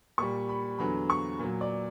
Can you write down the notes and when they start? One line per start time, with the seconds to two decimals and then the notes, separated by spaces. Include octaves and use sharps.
0.18 A#2 G3 C#6
0.49 B5
0.79 E2 D3 F#3 B5
1.10 C#6
1.39 A#2 F#3
1.61 D5